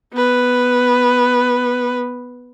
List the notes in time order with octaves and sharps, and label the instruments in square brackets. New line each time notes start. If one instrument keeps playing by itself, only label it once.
[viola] B3 B4